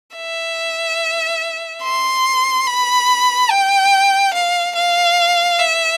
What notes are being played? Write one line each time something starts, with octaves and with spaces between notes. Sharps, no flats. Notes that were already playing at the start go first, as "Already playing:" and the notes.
E5
C6
B5
G5
F5
F5
E5